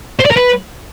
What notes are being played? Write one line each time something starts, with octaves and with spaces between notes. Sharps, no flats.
C5
D5
A#4
B4